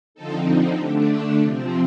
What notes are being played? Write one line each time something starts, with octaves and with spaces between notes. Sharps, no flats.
D3 F3 C4 D#4 A4
D3 A3 D4 G4
A4
C3 F3 C4